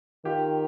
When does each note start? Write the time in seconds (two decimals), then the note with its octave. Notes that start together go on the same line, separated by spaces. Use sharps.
0.25 D#3 F4 G4